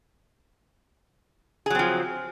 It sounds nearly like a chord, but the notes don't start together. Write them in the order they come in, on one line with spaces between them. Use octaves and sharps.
G#4 F#3 C4 F3